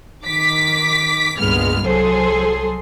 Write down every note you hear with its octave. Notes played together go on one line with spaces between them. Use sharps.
D#3 D6 B6
C#2 G2 A#2 G#3 B3 F6
C2 F#3 G#4 A4 C5 C6